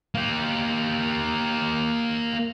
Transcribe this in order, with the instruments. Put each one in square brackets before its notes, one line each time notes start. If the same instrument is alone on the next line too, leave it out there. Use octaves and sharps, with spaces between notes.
[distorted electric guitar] A#3 G4